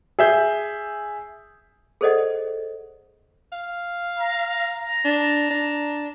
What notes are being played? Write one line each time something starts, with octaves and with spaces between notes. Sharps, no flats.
G#4 E5 G6
G#4 A4 C5 D5 D#5 F#5
F5
A#5
D4
D4